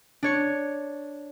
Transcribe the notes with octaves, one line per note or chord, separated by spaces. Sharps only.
D4 C#5 C#7